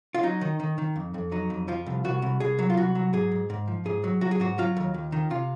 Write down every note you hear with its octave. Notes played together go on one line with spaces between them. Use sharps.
F4
F#3 D#4
D#3
D#3
D#3
F2
F2
F#3 D#4
F2
F3 F4
C2
C2 F#4
C2
C2 G#4
F#3
F4
C2 F#4
F#3
G#2 G#4
G#2
G#2
F3
G#2 G#4
F#3
F#3 F#4
G#4
G#2 F#4
F#3 F4
D#2
D#2
D#3
C3 F4